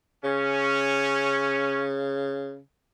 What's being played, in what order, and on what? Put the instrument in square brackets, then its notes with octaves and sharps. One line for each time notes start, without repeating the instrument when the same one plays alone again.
[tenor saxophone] C#3 [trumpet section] C#4